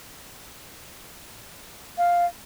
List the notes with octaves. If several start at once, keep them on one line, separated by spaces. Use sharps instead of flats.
F5